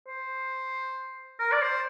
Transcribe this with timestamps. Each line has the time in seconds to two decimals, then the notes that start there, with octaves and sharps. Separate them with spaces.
0.08 C5
1.40 A#4
1.52 D5
1.62 C5